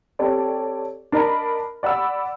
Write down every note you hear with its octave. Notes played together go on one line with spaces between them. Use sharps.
C4 G4 A4 C#5 D5
D4 A#4 D#5 A#5 B5
D5 F#5 B5 E6